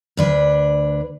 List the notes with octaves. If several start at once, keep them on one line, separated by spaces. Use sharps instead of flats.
D2 D4 B4